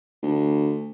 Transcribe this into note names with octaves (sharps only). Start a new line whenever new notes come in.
D2